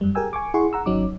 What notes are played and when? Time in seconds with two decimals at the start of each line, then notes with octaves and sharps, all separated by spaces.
0.01 F#2 G3
0.15 G4 G#4 A#4 G5 G#5 E6
0.33 G#5 C#6 D6
0.54 E4 G#4 F#5 C6 C#6
0.73 F#5 A#5 E6
0.86 G#1 F#3 C#4 D#4 D6